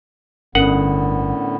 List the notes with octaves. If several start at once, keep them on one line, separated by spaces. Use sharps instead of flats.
G1 A2 D3 B3 C#4 A#4 F#5